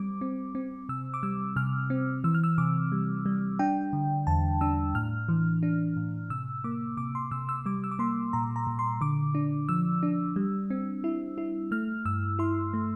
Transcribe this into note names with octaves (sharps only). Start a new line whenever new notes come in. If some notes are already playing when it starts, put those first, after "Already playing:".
Already playing: G3 C4 D6
C4
C4
C3 E6
D6
G3 E6
C3 F6
C4
E3 E6
F6
E6
C3 D6
G3
G3
D4 G5
D3
E2 A5
D4 E6
A2 F6
E3
D4
A2
C3 E6
A#3 D6
C3 D6
C6
C3 E6
E6
G3 D6
E6
D6
A#3 C6
A#2 A#5
A#5
A#2
C6
D3 D6
D4
F3 E6
D4
G3
C4
E4
E4
A3 F6
G2 E6
E4 C6
A3